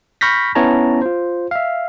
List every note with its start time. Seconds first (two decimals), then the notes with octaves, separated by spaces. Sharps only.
0.21 B5 C#6 F6 G6 A#6 B6
0.55 B3 C#4 E4 C#5 A5 A#5
1.02 F4 C5
1.51 E5 F5